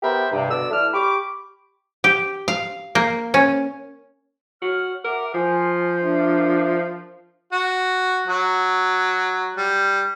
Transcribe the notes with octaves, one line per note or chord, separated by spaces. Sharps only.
B3 G4 A#4 C5 E5 B5
G2 C3
B2 D3 D5 E6
E3 A3 D5 F6
G4 B5 C#6 D6
G4
F5
A#3
C#4
F#4 C#5 F6
A#4 E5 F#5 D6
F3 C5 G#5
D4 A#4 E5
F#4
F#3
G3